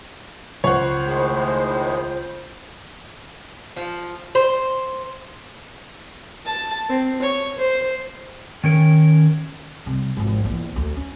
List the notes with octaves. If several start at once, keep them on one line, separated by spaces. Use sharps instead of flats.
C#2 C5 C#5 F#5 C7
A2 D#3 G#3
F3
C5
A5
C4
C#5
C5
D#3 C#4 A#4
C3 G3
G#1 F3
A#1 E2
D2
C#4